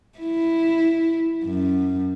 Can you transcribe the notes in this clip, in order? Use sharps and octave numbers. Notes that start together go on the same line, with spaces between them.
E4
F#2